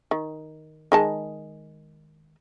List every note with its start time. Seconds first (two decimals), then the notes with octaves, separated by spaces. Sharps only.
0.11 D#3
0.92 D#3 G#3 A5